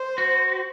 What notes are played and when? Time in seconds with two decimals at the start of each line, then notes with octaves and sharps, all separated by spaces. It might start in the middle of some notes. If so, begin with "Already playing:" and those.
Already playing: C5
0.18 F#4